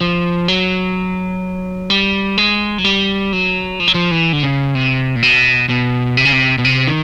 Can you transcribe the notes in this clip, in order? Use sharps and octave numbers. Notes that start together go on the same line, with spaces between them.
F3
F#3
G3
G#3
F#3
G3
F#3
F3
F#3
F3
E3
D3
C#3
C3
A#2
B2
B2
C3
C#3
C3
B2
C3
D#3